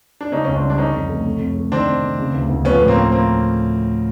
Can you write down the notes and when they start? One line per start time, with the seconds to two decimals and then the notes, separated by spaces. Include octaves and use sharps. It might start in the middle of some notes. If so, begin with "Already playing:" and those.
0.21 D4
0.32 C#3 C#4 D#4
0.45 C#2 C#4
0.55 C4 D4
0.63 G3
0.70 D4
0.78 D3 C#4 D#4
0.94 F2
1.09 A3
1.26 C3
1.41 F2
1.56 A3
1.72 D#3 C4 D4
1.87 C3
2.03 C3
2.18 C#3
2.34 D2
2.49 D2
2.65 F3 B3 C#4
2.81 A2
2.88 A#3 C4
2.96 C#4
3.12 A#3 C4